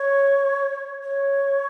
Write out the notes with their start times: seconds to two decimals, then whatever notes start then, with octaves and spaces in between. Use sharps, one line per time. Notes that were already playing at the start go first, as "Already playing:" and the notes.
Already playing: C#5
1.03 C#5